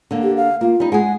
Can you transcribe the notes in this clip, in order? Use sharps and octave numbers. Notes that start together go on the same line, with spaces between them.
D3 A#3
G4
F5
A#3 F4
G3 D#4
G#3 G#4 F#5